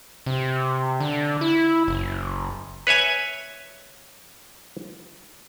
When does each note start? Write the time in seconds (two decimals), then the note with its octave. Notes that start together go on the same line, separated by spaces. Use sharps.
0.26 C3
1.00 D3
1.41 E4
1.88 F#1
2.87 B4 C#5 E5 G#5